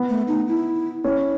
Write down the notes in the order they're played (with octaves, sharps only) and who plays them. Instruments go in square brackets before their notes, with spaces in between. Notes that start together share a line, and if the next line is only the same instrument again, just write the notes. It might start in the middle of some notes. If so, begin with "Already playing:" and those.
Already playing: [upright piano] B3
[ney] A3
D#4
E4
[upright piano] C#4 [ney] E4